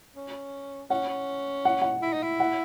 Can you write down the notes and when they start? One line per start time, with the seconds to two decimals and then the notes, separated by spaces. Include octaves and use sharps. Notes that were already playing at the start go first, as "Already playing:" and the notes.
0.16 C#4
0.90 C#4 F#5
1.09 C#4
1.65 F#5
1.82 F#5
2.02 E4
2.13 D#4
2.23 E4
2.40 F#5